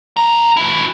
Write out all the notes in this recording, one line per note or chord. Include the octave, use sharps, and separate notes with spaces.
F2 A#5
E4 F#4